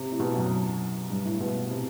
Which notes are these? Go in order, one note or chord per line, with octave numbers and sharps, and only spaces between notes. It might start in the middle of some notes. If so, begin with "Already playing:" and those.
Already playing: C3
A2
B2
F#2
G2
A2
B2
C3